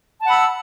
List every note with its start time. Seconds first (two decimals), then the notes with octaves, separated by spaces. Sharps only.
0.21 A5
0.25 F#5
0.28 B5
0.31 E6